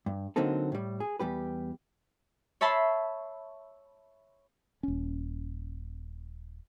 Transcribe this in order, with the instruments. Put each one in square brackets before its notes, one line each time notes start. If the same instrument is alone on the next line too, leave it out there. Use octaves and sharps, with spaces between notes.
[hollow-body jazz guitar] G2
D3 F#3 A#3 C4 D#4 A4
A2 G3
G#4
E2 G3 G4 B4
[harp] C#5 E5 A5 B5 C6
[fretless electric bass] D#1 C#4